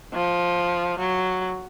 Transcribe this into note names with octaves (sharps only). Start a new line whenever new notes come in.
F3
F#3